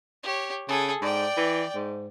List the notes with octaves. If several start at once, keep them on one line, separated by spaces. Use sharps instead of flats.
G4 C#5
C#3 G#4 A4
G#2 D5 G5
E3
G#2